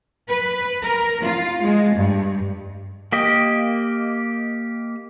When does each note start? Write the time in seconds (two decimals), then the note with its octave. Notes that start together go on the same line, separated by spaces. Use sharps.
0.28 B4
0.81 A#4
1.22 F4
1.61 G#3
1.92 G2
3.12 A#3 G4 D#5